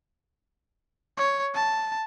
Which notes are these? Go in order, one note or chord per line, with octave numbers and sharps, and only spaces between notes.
C#5
A5